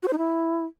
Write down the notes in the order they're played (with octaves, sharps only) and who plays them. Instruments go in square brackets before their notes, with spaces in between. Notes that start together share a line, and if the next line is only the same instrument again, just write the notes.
[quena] F#4
C5
D#4
E4